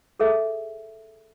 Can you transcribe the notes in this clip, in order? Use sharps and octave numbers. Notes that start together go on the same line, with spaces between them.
G#4 A4 E5